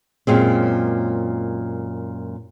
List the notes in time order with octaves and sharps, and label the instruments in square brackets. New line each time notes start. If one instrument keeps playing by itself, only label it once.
[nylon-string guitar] F#2 A#2 G#3 C4